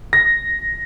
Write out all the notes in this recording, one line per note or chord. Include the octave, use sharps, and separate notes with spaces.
A#6